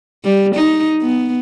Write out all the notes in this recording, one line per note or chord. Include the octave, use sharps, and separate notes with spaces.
G3
D#4
B3